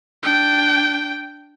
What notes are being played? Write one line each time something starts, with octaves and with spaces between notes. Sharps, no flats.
D4 G5